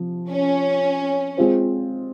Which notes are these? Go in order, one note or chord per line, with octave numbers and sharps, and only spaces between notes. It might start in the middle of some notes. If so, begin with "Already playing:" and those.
Already playing: C3 F3
C#4
G#3 C4 F4 C5